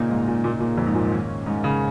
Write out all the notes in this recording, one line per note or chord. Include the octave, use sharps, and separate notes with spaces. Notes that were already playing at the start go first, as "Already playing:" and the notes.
Already playing: A#2 C#3 A#3 D#4
G#2
A#2
A#2
A#2
F2
G#2
A#2
G#2
D#3 A#3 C#4
G#2
C#3